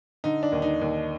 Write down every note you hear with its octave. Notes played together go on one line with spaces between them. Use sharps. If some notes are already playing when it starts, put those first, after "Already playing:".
D3 D#4
D4
D#2
D#4
D#2